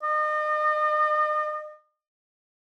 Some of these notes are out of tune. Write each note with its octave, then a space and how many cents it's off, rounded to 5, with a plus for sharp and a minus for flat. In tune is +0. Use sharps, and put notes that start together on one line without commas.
D#5 -40